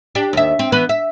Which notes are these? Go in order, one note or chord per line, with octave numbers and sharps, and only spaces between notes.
D4 G4
D#2 E5
C4
E3 B3 B4
E5